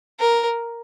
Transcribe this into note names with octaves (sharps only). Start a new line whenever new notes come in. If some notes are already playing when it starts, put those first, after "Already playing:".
A#4